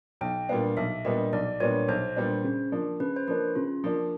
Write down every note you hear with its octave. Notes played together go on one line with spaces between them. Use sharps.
B1 G5
A#2 G3 B3 D4 F5
B1 E5
A#2 G3 B3 D4 D#5
B1 D5
A#2 G3 B3 D4 C#5
B1 C5
A#2 G3 B3 D4
C#3
F3 A#3 D4
C#3 B4
C5
F3 A#3 D4 B4
C#3 F4
F3 A#3 D4